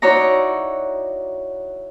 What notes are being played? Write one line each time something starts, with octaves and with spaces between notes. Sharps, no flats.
D#4 E4 F#4 C#5 D5 A#5